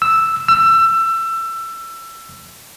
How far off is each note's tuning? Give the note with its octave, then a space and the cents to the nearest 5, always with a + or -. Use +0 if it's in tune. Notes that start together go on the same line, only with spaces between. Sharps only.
E6 +0
E6 +25